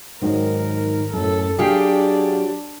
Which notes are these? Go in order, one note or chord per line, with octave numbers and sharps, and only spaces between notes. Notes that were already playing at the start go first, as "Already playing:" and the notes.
G#2 D#3 F#3 A#4
F#2 A2 A4
F#3 D4 G4 G#4 F5 G5